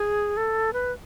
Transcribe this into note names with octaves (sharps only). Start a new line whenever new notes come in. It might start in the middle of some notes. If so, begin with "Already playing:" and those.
Already playing: G#4
A4
B4